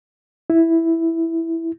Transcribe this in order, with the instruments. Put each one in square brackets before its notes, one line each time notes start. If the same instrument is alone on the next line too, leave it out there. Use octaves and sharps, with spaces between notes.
[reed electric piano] E4